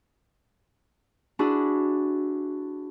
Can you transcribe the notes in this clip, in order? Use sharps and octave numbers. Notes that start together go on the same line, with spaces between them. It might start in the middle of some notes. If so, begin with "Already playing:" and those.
D4 E4 F#4 G#4